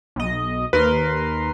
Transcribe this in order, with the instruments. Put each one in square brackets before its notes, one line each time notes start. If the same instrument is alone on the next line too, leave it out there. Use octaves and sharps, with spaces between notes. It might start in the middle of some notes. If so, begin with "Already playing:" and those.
[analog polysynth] B1 D#5
[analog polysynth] D#2 A#4 C6 [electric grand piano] B4